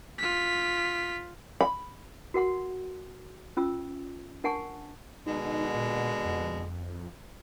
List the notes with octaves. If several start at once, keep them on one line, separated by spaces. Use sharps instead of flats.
F4 B6
B5
F#4 A#4 F#5 C6
C#4 F4 E6
D4 A#4 F#5 G#5 A5 C#6
B2 D3 G#3 D#4
A#2
F2